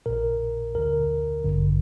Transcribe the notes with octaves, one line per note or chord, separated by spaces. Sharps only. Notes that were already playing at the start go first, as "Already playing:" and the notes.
A#1 A#2 A#4
D2 D3 A#4
A1 G2 D3